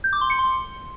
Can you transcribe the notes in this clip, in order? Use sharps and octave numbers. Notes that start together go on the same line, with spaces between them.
G6
D6
C6
C#7
C6